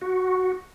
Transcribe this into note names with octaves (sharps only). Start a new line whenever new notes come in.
F#4